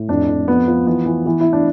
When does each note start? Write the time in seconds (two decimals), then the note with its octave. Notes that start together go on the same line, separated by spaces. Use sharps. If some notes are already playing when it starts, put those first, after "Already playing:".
Already playing: A2
0.09 F2 D4
0.29 F2
0.48 F3 B3
0.68 F3
0.87 E3 B3
1.06 E3
1.26 E3
1.41 E3 E4
1.53 D4